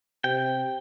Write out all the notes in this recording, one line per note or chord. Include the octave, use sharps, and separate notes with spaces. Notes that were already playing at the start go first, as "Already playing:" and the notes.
C3 G5